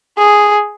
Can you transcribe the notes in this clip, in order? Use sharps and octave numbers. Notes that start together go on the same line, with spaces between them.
G#4